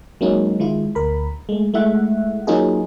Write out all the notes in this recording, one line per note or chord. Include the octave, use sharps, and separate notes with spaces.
F#3 G#3 A#3 C#4 D#4
D#3 G#3 E4 F4
D2 A#4 B5
G#3 A3
G#3 A3 E4 E5 F#5
F#3 A#3 C#4 D#4 F4 G#4